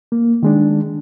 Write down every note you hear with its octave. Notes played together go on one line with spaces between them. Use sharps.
A#3
D#3 G#3 D4